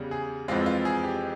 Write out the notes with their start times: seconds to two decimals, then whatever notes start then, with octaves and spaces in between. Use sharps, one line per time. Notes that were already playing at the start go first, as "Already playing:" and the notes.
Already playing: E2 C#3 G3
0.11 G#4
0.48 F2 E3 G#3 C4 F4
0.66 F4
0.85 G#4
1.03 G4